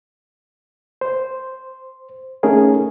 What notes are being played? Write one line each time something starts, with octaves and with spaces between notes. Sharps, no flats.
C5
A3 C#4 D#4 G#4 A#4